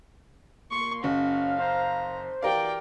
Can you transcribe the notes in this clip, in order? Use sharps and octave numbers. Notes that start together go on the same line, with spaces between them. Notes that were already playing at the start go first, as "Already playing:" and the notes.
A#2 A#3 C6 C#6
F#1 C#4 F#4 F5
C5 A#5
E3 F#4 G4 A#4 D5 F5 G5